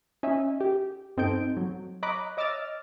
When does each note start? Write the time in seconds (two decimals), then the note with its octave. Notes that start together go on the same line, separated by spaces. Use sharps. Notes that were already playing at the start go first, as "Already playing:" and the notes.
0.23 C#4 D#4 E5
0.60 G4
1.17 G2 C4 D#4 A4 G6 D7
1.57 F#3
2.03 C#5 D#5 A#5 B5 D6 F#6
2.37 C#5 D#5 D6 E6 F6 A6